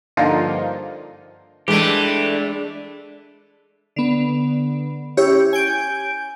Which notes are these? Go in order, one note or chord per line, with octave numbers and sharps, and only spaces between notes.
G2 D3 F3 A#3 D#4 F4
E3 G#3 A3 D4 G4
D3 B3
C#4 E4 G4 C#5
G#5 G6 D7